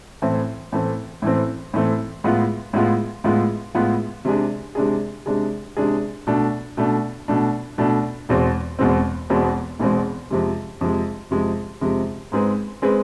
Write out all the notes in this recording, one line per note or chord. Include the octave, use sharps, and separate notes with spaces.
A2 E3 A3 C4
A2 E3 A3 C4
A2 E3 A3 C4
A2 E3 A3 C4
A2 G#3 B3 F4
A2 G#3 B3 F4
A2 G#3 B3 F4
A2 G#3 B3 F4
C3 G#3 D4 G#4
C3 G#3 D4 G#4
C3 G#3 D4 G#4
C3 G#3 D4 G#4
B2 A3 D4
B2 A3 D4
B2 A3 D4
B2 A3 D4
E1 E2 B2 G#3 C4
E1 E2 B2 G#3 C4
E1 E2 B2 G#3 C4
E1 E2 B2 G#3 C4
F2 C3 G#3
F2 C3 G#3
F2 C3 G#3
F2 C3 G#3
G#2 G#3 C4 G#4 B4
G#3 C4 G#4 B4